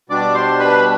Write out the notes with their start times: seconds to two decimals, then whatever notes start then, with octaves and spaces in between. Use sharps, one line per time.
0.10 B2 G3 D4 D5 D6
0.34 C5 C6
0.59 B4 B5